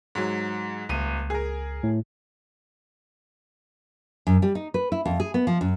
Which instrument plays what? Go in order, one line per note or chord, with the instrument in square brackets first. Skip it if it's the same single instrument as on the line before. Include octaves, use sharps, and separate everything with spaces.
[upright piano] G#2 F#3
[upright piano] D#1 D#7 [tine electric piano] C#2
[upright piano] G#4 A#4
[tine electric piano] A2
[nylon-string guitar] F#2
G3
D#4
B4
E4
F2
G#4
B3
F3
F#2